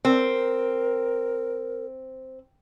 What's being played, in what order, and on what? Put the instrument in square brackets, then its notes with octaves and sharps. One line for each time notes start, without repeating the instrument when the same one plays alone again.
[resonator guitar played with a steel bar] C4 [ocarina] A#4